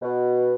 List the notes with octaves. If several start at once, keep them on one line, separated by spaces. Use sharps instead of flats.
B2